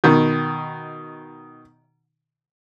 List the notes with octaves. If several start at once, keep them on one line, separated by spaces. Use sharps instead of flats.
B2 D#3